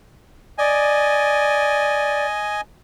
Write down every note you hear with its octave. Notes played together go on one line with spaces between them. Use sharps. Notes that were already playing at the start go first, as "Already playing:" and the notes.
D5 D#5 G#5